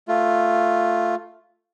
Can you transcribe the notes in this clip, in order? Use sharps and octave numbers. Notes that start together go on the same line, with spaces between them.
A3 F4